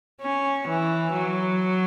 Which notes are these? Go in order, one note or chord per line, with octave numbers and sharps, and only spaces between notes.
C#4
E3
F#3